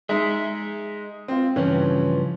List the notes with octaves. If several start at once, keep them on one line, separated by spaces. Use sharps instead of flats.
G#3 D#4 G#4 E5
C4 F4
G2 C#3 E3 F3 C#4